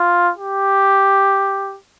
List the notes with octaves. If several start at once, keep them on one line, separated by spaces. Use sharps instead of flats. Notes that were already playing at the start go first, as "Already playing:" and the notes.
Already playing: F4
G4